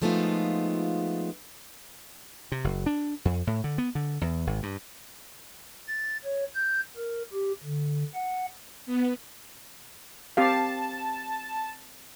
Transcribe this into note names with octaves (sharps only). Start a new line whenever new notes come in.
F3 G#3 A3 B3 D#4 F4
C3
F#1
D4
F2
A2
D3
B3
D3
E2
G#1
G2
A6
C#5
G6
A#4
G4
D3
F#5
B3
C4 G4 F5 A5